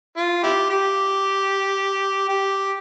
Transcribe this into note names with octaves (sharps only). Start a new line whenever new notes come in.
F4
E4 G4
G4
G4